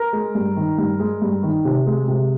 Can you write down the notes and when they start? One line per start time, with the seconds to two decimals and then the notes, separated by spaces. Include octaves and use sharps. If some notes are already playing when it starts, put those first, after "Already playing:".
Already playing: A#4
0.13 G#3
0.35 G2
0.56 D#3
0.78 G2
1.00 G#3
1.22 G2
1.43 D#3
1.65 C3
1.86 G#3
2.08 C3